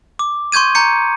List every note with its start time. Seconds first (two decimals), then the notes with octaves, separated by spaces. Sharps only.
0.19 D6
0.52 C6 C#6 G6 G#6 D#7
0.75 A#5 G6 C#7